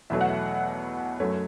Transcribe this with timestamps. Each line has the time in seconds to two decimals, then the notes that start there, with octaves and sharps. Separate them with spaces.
0.10 E2 B2 F#3 A3 E5
0.21 F#5
0.30 E5
1.20 F#2 F#3 A3 C#5